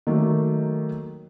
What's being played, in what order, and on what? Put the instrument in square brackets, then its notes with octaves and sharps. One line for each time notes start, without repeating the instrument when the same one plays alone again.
[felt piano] D#3 F#3 A3 A#3